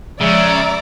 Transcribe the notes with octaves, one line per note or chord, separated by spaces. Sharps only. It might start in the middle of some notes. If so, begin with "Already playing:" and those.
C#3 F3 G#3 G#4 D5 E5 A#5